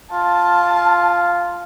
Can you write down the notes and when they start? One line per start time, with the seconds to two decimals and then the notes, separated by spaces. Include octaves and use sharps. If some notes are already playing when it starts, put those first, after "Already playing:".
0.13 F4 A5